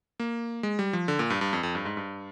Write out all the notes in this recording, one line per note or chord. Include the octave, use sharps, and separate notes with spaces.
A#3
G#3
G3
F3
D3
A#2
G2
G2
F2
F2
G2
G#2
G2